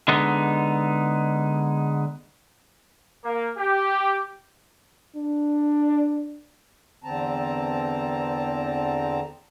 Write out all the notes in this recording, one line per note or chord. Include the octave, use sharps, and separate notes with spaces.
D3 G#3 B3 D#4
A#3
G4
D4
E2 D3 C4 A5 A#5